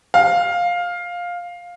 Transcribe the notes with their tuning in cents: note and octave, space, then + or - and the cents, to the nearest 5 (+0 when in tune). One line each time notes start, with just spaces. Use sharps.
F5 +10